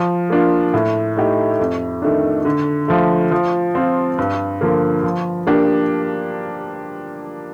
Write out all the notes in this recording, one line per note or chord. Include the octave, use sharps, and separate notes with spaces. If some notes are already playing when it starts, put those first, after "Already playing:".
Already playing: F3
A#3 D4 F4
A2
A3 D#4 G4
F2
D#3 A3 D4
D3
F3 A3
F3
C4 F4
G2
D3 F3 A#3
F3
A#3 D4 G4